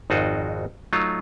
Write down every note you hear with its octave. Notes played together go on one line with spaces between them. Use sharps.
G#1 F2 D#4 F4 F#4 D#5
F#3 A3 D#4 F4